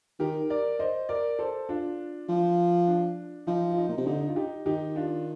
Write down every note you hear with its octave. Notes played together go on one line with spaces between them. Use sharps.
D#3 G4 A#4
A#4 D5
C5 D#5
A#4 D5
A4 C5
D4 F4
F3
D4
F3 D#4
F4
D#4
A#2
C3
D3 D#4
D#4
F4
D#4 G4
D#3 D#4 G4
D4 F4